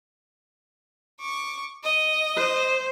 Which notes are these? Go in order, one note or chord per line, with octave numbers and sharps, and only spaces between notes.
C#6 D6
D#5
C5